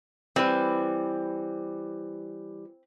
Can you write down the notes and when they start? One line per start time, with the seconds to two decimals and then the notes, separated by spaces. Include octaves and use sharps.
0.36 E3 G3 C4 B4